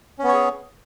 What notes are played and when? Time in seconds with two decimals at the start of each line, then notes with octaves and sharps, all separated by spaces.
0.19 C#4
0.24 B3
0.28 C#5
0.33 G#4